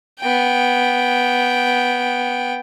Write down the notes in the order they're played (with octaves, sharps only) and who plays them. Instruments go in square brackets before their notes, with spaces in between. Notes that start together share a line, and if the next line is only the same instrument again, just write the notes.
[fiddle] B3 G5